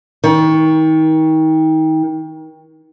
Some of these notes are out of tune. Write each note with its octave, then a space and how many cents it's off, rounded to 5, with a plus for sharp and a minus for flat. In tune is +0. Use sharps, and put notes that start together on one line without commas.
D#3 +30